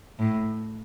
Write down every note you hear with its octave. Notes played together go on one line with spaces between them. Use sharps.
A2